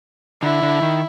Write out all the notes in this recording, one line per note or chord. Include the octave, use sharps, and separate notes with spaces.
D3 E4
D3
D#3